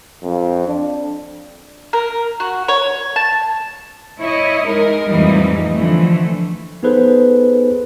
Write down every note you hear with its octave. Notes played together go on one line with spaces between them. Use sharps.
F2
D4
A#4
F#4
C#5
A5
E4 C#5 D#5
G#3 D#4 A#4
F2 A2 E3 G3 G#3 D#4
D3 E3 F3 A3
B3 D#4 G#4 A4 B4 C5